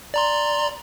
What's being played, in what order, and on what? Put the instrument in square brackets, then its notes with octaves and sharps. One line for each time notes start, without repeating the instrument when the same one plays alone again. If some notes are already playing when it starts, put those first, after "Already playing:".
[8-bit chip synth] D5 A#5 C6